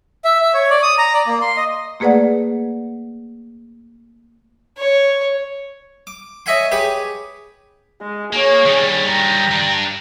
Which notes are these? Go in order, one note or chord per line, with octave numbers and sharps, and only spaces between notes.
E5
E5
C#5
D5
D#6
A#5
D5
A#3
C6
D#5
A3 A#3 G#4 B4 D5 F#5
C#5
D6
C#5 D#5 E5 F#5 G#5 C6
G4 G#4 B4 C#5 G#5
G#3
A#3 G#4 C#5
D#3 G3
G5 A#5
G2 D4